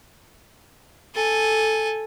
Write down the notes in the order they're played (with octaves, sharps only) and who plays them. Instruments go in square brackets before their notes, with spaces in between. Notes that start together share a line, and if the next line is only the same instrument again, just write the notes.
[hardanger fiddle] A4 G#5